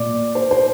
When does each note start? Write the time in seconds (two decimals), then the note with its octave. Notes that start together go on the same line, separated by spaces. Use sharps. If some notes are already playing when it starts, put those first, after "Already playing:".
Already playing: A#2 D5
0.35 C5
0.51 C5